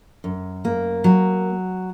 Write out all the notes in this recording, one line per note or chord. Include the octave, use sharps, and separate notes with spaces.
F#2
A#3
F#3